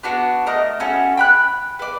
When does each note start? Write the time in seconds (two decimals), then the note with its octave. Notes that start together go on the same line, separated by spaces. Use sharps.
0.03 B3 D4 F#4
0.46 A3 A#4 D#5
0.80 C#4 E4 F#4 A4
1.17 G5 B5 F#6
1.79 B4 D5